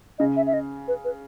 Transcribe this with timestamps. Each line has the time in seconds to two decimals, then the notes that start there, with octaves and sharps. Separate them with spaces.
0.19 C#3 D#5
0.36 E5
0.47 E5
0.53 D#5
0.88 B4
1.05 B4